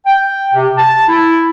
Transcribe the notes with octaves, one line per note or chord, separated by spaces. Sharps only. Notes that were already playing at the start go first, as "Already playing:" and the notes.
G5
C3
A5
E4